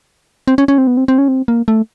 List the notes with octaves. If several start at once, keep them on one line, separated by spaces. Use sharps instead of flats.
C4
C#4
C#4
C4
B3
C4
C4
C#4
C4
A#3
A3